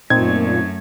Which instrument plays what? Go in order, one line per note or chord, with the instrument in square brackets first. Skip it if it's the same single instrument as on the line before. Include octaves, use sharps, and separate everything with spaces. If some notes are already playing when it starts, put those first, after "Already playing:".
[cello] F#2 A3 [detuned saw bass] A#2 [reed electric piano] C4 D#4 [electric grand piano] G#6